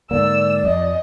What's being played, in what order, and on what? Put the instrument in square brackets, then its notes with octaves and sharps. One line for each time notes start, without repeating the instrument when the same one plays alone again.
[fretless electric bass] G#2 D3 A#3 [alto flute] D5 [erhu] E6
[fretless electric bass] F2 [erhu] D#5